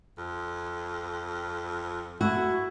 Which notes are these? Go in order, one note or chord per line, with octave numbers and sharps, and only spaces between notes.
F2
F#2 A3 E4 F#4